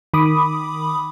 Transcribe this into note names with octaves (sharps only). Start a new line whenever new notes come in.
D#3 B5 D6 D#6